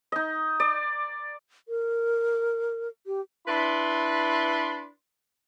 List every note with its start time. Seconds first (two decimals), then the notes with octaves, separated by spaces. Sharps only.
0.12 D#4 D#5
0.60 D5
1.68 A#4
3.06 G4
3.47 D4 E4 B4 B5 C6